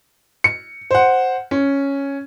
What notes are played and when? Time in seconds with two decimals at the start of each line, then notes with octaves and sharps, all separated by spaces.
0.44 C#7
0.91 C5 F#5
1.51 C#4